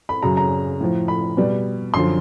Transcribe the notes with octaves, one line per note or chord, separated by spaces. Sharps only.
B5
F#2 C#3 F#3 A#5
A#5
A2 F3
B5
B2 G3
F#2 D3 F3 C6